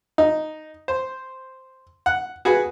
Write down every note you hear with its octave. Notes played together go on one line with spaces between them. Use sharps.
D#4
C5
F#5
F#4 G#4 B4